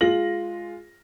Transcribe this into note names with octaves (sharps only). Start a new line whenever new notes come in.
G#3 F4 A#6 F#7